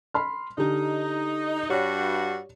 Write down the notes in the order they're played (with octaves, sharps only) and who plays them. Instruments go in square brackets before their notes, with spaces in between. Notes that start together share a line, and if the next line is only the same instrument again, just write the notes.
[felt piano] B5 C6 F6
[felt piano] D3 G4 [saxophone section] D#4
[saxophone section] G2 F#4 [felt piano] G4 C#5 D5